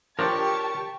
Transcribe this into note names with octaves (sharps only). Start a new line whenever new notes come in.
F3 D4 G4 A#4 C#5 A5 C#6